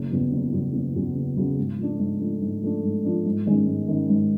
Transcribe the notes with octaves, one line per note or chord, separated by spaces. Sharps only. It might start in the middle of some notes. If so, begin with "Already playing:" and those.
Already playing: F#1
E2 C#3 F#3 B3
F#1
E2 C#3 F#3 B3
F#1
E2 C#3 F#3 B3
F#1
E2 C#3 F#3 B3
G#2
F3 A3 D4
G#2
F3 A3 D4
G#2
F3 A3 D4
G#2
F3 A3 D4
G#2
D#3 G#3 C#4
G#2
D#3 G#3 C#4
G#2